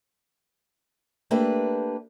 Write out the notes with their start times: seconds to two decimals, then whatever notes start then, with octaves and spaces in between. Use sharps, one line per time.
1.31 A3 A#3 D4 G4 B4